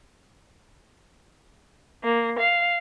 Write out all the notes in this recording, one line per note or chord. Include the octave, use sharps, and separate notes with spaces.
A#3
F5